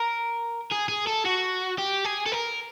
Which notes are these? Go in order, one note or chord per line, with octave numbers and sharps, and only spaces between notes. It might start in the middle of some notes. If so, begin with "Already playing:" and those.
Already playing: A#4
G#4
G#4
A4
F#4
G4
G#4
A4
A#4